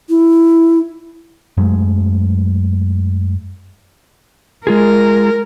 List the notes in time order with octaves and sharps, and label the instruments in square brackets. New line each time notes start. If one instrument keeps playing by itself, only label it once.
[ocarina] E4
[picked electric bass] F#2 F#3 G#3 A3
[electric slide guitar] G#3 F4 G#4 [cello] A#4